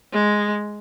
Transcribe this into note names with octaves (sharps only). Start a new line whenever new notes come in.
G#3